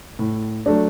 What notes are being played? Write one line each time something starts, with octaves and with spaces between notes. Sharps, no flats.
A2
F#3 A3 D4